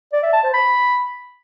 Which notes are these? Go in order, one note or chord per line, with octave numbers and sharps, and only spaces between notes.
D5
E5
A5
C5
B5